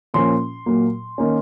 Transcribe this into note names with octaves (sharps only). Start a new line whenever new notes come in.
A#2 F3 A#3 C#4 C6
A#2 F#3 A#3
D#3 A#3 C#4